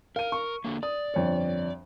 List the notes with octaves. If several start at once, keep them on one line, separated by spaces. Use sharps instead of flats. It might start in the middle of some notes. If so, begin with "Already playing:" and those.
A#4 F5 D#7
C#6
D3 A#3
D5 D#6
G1 F2 C#5